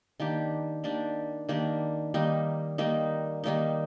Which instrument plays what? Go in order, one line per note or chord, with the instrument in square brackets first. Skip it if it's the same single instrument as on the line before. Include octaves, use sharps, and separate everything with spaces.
[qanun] D#3 A#3 D4 G4
D#3 A#3 D4 G4
D#3 A#3 D4 G4
D#3 G3 A#3 D#4
D#3 G3 A#3 D#4
D#3 G3 A#3 D#4